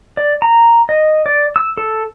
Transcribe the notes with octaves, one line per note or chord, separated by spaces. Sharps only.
D5
A#5
D#5
D5
E6
A4